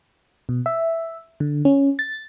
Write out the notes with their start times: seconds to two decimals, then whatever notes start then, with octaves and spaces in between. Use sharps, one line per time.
0.49 B2
0.66 E5
1.40 D3
1.65 C#4
1.99 A6